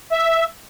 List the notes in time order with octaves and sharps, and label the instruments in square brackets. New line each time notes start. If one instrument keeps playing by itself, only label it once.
[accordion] E5